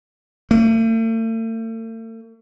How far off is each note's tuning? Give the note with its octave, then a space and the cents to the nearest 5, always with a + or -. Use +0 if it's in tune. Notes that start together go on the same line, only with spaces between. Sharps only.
A3 +40